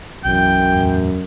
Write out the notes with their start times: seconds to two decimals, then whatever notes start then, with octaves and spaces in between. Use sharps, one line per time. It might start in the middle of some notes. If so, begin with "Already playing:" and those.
0.25 B1 F#2 E3 G5
0.74 E2 A2